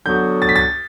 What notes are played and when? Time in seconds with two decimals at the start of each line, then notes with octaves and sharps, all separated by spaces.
0.05 D3 F#3 B3 F#4 G6
0.42 A6
0.49 B6
0.56 A6